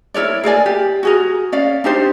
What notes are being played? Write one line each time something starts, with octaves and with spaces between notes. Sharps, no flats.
E4 A#4 C#5 D5
G#4 A#4 D5 G#5
G4
F#4 G#4 A#4
C#4 D5 F5
D4 D#4 G4 C5